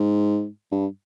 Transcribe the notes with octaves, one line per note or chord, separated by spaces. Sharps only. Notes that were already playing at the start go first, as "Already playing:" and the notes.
Already playing: G#2
G2